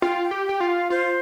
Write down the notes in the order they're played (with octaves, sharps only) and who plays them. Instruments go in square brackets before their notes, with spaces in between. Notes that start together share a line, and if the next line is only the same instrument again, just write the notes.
[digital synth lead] F4 [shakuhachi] G5
[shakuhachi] G5
[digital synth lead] G4
[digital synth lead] G4 [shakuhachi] G5
[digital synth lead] F4
[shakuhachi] F5
[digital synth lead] F4 [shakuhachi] C5